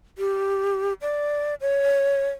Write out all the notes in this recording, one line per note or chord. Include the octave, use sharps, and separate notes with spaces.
G4
D5
C#5